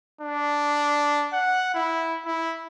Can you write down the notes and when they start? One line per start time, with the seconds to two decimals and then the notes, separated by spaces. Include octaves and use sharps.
0.21 D4
1.33 F#5
1.74 E4
2.26 E4